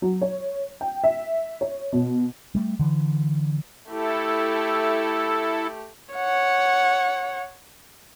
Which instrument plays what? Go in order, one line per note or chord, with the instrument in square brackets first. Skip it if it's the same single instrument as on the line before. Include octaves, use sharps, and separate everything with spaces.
[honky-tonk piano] F#3
C#5
G5
E5
C#5
B2
[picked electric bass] G3 A3
D3 E3
[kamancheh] A3 G4 [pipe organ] E4 A4
[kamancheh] C#5 F#5